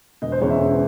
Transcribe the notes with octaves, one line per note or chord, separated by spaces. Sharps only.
E1 D#5
C5
E2 C#3 G#3 C#5
E5
E1